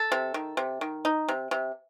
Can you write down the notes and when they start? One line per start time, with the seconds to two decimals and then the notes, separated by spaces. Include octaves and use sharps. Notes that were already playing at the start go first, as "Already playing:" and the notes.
Already playing: A4
0.12 C3
0.34 D#3
0.57 C3
0.81 D#3
1.05 D#4
1.29 C3
1.51 C3